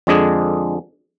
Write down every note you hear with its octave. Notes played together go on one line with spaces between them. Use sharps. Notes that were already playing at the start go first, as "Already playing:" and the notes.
F2 D3 G#3 D4 G#4